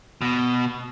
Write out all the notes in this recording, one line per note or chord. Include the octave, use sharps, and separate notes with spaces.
B2